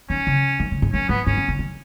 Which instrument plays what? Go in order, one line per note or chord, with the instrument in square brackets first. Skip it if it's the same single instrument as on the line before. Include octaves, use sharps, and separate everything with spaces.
[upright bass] D#3 [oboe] C#4
[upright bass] C#3
D#3
C#3
G#2
[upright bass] F#2 [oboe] C#4
[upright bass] G#2 [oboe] B3
[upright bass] G#2 [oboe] C#4
[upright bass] C#3
C#3
D#3